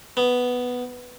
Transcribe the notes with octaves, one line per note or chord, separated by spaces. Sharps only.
B3